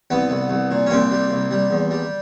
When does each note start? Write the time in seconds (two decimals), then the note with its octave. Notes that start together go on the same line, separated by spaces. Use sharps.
0.10 C2 B3
0.30 C2
0.50 C2
0.71 A#2
0.86 C#4
0.90 C2 A#3 C4
1.11 G3
1.31 C2
1.51 G3
1.71 E2
1.91 G3